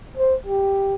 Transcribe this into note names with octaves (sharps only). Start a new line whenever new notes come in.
C5
G4